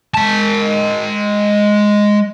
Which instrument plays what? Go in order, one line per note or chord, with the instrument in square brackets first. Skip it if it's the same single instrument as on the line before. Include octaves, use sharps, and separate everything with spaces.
[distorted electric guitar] G#3 A5